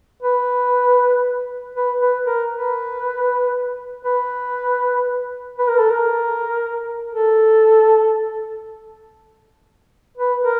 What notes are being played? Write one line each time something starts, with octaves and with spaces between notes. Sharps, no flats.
B4
B4
B4
A#4
B4
B4
B4
A#4
A4
A#4
A4
B4
A#4